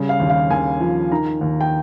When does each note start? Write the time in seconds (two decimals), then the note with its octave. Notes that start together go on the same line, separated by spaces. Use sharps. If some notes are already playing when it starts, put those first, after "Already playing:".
Already playing: C#3 G3
0.09 F5
0.20 D#2
0.30 F5
0.50 D#2 G#5
0.80 F3
1.12 D#3 A#5
1.41 D#2
1.61 G5